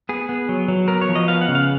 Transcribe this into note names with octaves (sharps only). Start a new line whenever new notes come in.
B3 G#4
B3
F#3
F#3
B3 A#4
C#5
F3
D#5
B3 F5
F#5
C#3
F5